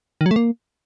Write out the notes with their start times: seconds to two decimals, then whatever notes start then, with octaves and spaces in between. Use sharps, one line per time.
0.21 D#3
0.26 F#3
0.31 A3
0.36 A#3